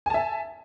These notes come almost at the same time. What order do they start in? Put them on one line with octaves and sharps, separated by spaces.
G#5 A5 E5